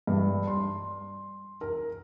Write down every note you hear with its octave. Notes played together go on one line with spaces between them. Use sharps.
G2
C6
A#4